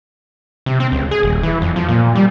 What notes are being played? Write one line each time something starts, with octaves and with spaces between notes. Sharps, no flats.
C3
C4
C#2
G#4
D#1
E3
F2
F3
A#2
G3